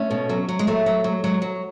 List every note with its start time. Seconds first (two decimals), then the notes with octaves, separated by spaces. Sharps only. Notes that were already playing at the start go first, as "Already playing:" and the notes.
Already playing: A3 C#4
0.11 B2
0.29 F#3
0.49 F#3
0.59 G#3
0.67 F#3 A3
0.86 F#3
1.04 F#3
1.24 F#3 G#3
1.42 F#3